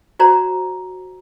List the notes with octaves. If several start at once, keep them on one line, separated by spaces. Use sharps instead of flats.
F#4 C5 D5 A#5